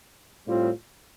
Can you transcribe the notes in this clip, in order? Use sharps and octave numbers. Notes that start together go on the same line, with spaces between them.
A2 G3 C4 F4